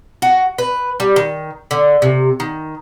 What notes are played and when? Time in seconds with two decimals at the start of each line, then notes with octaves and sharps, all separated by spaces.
0.22 F#4
0.58 B4
1.00 G3
1.16 D#3
1.71 D3
2.02 C3
2.40 D#3